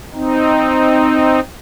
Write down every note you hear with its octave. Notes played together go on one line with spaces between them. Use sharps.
C4 D#4